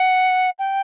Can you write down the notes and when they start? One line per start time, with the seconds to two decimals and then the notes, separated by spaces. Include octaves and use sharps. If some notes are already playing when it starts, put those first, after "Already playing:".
Already playing: F#5
0.59 G5